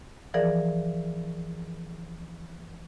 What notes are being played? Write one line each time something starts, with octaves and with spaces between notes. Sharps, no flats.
E3 F3 G#4 A#4 D5